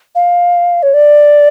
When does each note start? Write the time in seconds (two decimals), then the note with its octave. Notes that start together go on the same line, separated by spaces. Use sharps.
0.15 F5
0.83 C#5
0.94 D5